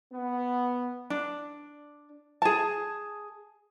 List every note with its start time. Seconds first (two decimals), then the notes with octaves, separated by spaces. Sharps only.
0.13 B3
1.10 D4
2.42 G#4 A5